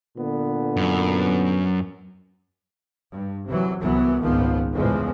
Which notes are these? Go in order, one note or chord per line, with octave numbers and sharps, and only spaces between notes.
A#2 D3 B3
F#2
G2
C3 E3 F#3
C2 E3 F#3 B3
G#1 C#2 A#2 D#3 F3 B3
E2 A2 C#3 E3 F3 G#3